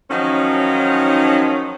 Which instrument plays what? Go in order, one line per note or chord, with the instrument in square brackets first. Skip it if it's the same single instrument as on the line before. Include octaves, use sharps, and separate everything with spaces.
[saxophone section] D#3 F3 F#3 C#4 D#4